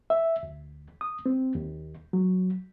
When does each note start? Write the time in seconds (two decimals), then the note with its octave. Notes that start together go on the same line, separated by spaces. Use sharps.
0.10 E5
0.43 D2
1.01 D#6
1.26 C4
1.55 D#2
2.13 F#3